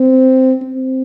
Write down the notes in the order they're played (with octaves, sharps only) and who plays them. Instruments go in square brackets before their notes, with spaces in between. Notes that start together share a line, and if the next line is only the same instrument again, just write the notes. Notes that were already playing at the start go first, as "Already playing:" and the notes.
Already playing: [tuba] C4
C4